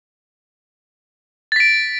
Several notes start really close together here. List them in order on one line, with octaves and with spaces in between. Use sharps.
A6 B6 D7